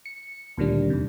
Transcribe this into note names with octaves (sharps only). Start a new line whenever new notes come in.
C#7
D2 A#2 D#3 G3 D4
E2 C3